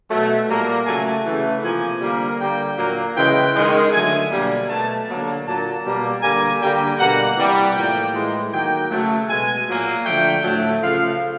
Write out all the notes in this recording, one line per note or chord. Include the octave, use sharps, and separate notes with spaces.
B2 F#3 A3
A#2 G3 A#3
C#3 F#3 A3 G#5
C#3 E3 A3
C3 F3 A#3 G#5
D3 G3 A#3
D3 G3 A#3 G5
A#2 F#3 A#3
C#3 E3 G#3 G5
D#3 G#3
D3 F#3 A3 G#5
B2 G3 A#3
B2 F#3 A3 A5
D3 F#3 A#3
A#2 F#3 A#3 A5
B2 G3 A#3
D3 G3 A#3 G#5
D3 G3 A#3 G5
B2 G3 A#3 F#5
C3 E3 G3
A2 F3 A#3 G5
A2 E3 G#3
D#3 F#3 A#3 G5
C#3 F#3 A3
B2 G#3 G#5
A#2 F#3 A#3
D3 F3 A3 G5
A2 F#3 A3
C#3 F3 A3 F5